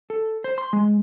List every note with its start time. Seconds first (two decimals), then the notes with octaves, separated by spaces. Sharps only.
0.10 A4
0.44 C5
0.58 C6
0.73 G#3